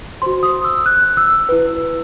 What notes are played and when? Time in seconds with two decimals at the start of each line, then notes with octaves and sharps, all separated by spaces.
0.22 F#4 C5 C6
0.43 D#6
0.64 E6
0.86 F#6
1.17 E6
1.49 E4 B4